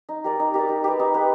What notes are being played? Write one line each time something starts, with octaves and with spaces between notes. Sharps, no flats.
D#4
G4 A#4 D5
D#4
G4 A#4 D5
D#4
G4 B4
D#4
G4 B4